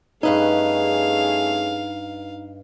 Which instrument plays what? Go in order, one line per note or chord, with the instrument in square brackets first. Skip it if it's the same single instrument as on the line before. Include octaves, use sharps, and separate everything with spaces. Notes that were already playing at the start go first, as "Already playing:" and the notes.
[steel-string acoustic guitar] G2 B4 D#5 [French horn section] A3 C#4 G#4 [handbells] D#4 [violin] F5